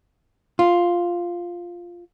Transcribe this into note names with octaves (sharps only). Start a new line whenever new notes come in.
F4